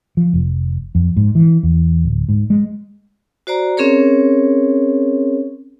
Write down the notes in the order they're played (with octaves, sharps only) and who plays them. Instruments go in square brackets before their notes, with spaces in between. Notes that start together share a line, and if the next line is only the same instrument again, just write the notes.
[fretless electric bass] F3
F1
F2
G#2
E3
E2
D1
G#2
G#3
[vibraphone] F#4 C5 D5 A#5
C4 C#4 G#4 A#4 C#5